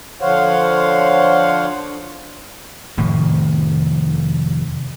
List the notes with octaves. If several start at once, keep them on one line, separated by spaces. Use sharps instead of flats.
D3 F3 C5 C#5 F5 F#5
F1 A2 D#3 F3